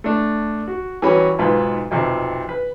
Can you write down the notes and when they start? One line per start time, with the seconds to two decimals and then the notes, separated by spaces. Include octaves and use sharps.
0.04 A3 D4
0.68 F#4
1.02 E3 F#3 G3 C#4 F#4 B5
1.39 B1 G#2 F4 B4
1.91 B1 F2 C3
2.49 B4